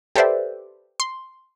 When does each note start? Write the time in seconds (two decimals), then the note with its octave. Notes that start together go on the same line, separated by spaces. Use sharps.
0.16 G4 A4 B4 C5 D5 E5
1.00 C6